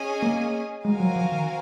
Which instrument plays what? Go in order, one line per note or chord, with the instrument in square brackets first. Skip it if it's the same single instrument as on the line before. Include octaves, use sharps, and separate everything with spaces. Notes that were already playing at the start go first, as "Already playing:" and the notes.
Already playing: [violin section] C#4 G#4 D#5 G#5
[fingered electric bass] A#3
[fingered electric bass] G#3 [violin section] C4 F#4 A#4 F5 G#5
[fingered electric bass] F#3
F3
D#3